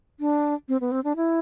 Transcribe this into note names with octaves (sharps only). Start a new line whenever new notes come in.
D4
C4
B3
C4
D4
E4